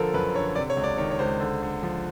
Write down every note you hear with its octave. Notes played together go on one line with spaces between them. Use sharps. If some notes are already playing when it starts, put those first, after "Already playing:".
Already playing: D3 F3 A4 A#4
F#2 B4
D3 C#5
C3 D5
C#5
C#2
D5
D#3 C#5
C#5
C#2 C5
D3
D3
F3